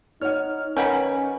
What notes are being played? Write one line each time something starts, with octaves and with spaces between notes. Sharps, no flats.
D#4 C#5 F#5 F6
D#3 F#3 C#4 B4 B5